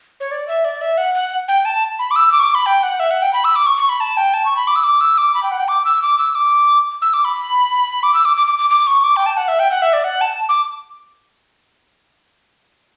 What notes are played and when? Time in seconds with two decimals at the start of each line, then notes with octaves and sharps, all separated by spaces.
0.20 C#5
0.31 D5
0.48 E5
0.65 D5
0.81 E5
0.98 F#5
1.15 F#5
1.48 G5
1.65 A5
1.99 B5
2.11 D6
2.16 E6
2.32 D6
2.40 C#6
2.43 D6
2.55 B5
2.66 G5
2.83 F#5
3.00 E5
3.11 F#5
3.22 G5
3.33 B5
3.44 E6
3.56 D6
3.66 C#6
3.77 C#6
3.89 B5
4.00 A5
4.17 G5
4.34 A5
4.45 C#6
4.56 B5
4.67 D6
4.76 E6
4.84 D6
5.01 E6
5.18 D6
5.34 B5
5.43 G5
5.51 F#5
5.60 G5
5.68 D6
5.85 E6
6.02 D6
6.18 E6
6.35 D6
7.02 E6
7.13 D6
7.25 B5
8.03 D6
8.14 E6
8.25 D6
8.37 D6
8.47 D6
8.59 D6
8.70 D6
8.87 C#6
9.04 D6
9.16 G5
9.26 A5
9.37 F#5
9.48 E5
9.59 G5
9.71 F#5
9.82 E5
9.93 D5
10.04 F#5
10.21 A5
10.49 D6